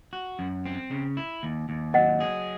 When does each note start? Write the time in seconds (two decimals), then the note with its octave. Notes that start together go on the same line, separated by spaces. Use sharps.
0.13 F#4
0.39 F#2
0.66 C4
0.91 C#3
1.17 E4
1.43 D#2
1.69 D#2
1.94 F#3 D#5 F#5
2.20 G#4